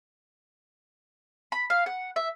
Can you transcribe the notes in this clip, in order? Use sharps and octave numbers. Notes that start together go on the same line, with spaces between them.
B5
F5
F#5
E5